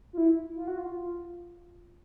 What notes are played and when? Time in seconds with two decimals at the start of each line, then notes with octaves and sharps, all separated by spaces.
0.13 F4
0.18 E4
0.56 F4
0.67 F#4
0.78 F4